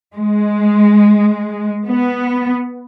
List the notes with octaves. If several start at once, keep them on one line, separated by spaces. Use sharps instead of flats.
G#3
B3